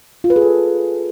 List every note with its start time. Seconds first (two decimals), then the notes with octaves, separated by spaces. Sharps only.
0.24 F4
0.30 B4
0.36 G#4
0.42 A4